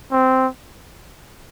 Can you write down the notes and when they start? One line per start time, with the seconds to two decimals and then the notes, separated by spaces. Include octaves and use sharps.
0.12 C4